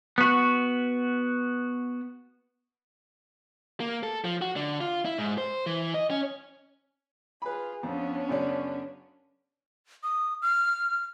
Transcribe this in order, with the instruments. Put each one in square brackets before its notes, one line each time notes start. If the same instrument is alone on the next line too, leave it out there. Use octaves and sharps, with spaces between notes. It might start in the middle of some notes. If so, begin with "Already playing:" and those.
[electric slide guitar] B3 F#4
[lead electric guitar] A#3
A4
F3
F#4
D3
F4
E4
G#2
C5
E3
D#5
C#4
[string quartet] F4 G#4 [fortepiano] B4 B5
[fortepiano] F2 [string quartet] B3 C#4 D4
[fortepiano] F#2 C#3 D5
[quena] D#6
F6